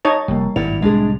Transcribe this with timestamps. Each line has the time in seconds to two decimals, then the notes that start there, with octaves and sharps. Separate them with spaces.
0.05 D#4 C#5 D#5 A5
0.28 F1 G3 A#3
0.56 G#1 G2 A#2 E4 D5 F#5 F7
0.82 C2 A2 G#3 D4 G#4